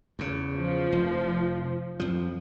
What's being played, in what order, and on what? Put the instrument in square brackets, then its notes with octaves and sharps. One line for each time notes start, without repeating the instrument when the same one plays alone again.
[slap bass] E2 C#3
[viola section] F3
[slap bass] F1
F2 F3